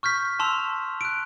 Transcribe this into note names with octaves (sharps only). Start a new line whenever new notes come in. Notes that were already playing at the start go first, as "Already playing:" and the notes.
C#6 F6 G6 B6
A5 C6 E6 F7
F#6 D7